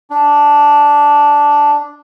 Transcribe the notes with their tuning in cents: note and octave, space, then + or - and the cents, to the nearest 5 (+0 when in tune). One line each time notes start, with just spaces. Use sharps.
D4 -10